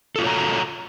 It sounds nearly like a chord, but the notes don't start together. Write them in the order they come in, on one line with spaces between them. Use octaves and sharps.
A4 F4 F#4 C#5 A#5